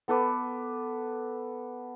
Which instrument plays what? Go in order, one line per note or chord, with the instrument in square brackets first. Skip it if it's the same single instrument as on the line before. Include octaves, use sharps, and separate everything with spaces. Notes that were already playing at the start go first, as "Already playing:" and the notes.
[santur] B3 A4 B4 D6